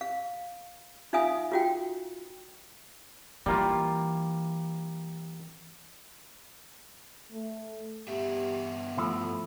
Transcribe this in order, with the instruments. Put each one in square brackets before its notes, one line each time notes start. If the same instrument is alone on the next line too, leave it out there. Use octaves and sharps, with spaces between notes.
[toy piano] F5
D#4 F4 E5 F5 G#5 D#6
F4 F#4 G5
[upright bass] E3 [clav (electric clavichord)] G3 A#3 F4
[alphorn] A3
[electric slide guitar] G2 B3 E5 [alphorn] G4
[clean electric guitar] F3 E4 [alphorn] A3